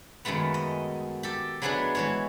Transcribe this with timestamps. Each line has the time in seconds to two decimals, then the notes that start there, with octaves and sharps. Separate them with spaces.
0.25 F#2 D#3 G#3 A3 B3
0.54 D#5
1.23 G4 A4
1.62 F#3 G#3 A3 B3 D4 G#4
1.95 E3 G#3 C#5